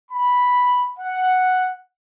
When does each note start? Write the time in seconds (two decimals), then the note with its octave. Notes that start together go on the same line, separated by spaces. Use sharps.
0.11 B5
0.99 F#5